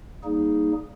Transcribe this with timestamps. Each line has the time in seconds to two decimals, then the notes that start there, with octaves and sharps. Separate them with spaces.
0.23 G3 A#3 D#4 G#4